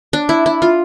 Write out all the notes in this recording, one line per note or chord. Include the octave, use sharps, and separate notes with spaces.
D4
E4
E4
F4